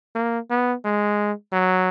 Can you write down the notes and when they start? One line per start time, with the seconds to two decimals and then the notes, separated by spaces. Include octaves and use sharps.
0.15 A#3
0.50 B3
0.85 G#3
1.53 F#3